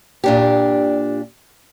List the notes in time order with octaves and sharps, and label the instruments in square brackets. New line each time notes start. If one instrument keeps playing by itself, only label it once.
[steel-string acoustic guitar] A#2 D4 G4